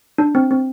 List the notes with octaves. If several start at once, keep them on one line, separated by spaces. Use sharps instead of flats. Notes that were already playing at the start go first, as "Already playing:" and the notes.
D4
C4
C4